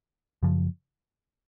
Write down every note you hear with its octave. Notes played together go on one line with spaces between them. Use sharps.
F#2 C#3 F3